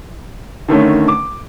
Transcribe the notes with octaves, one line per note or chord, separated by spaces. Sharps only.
D3 D#3 A3 C#4
D6